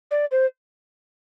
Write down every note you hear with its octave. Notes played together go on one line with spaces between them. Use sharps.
D5
C5